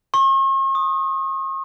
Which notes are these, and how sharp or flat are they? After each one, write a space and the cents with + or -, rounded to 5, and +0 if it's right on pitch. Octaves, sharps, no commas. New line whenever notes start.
C#6 -45
D#6 -5